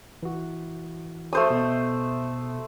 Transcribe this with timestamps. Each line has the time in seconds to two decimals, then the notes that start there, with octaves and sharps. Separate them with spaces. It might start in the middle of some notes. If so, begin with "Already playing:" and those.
0.23 E3 F#4
1.33 A3 C5 D#6
1.50 B2